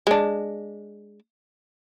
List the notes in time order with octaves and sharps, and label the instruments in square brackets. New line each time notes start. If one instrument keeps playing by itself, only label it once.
[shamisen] G#3 D4